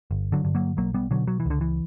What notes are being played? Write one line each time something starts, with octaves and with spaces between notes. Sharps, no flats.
G1
D3 F#3
G2 D3
F#3 A#3
B1 F#3 A#3
G3 B3
B2 D3 F#3
F#3
E3
C#2 D3
E3